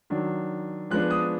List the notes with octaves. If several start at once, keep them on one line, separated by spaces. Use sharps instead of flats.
D#3 F#3 D4
F3 G#3 B3 D4 F#6
D#6